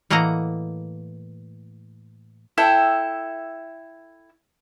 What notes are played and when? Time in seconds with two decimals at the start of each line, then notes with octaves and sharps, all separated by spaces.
0.10 A2 E3 A#3 D#5 F#5 A#5
2.57 E4 A4 E5 G5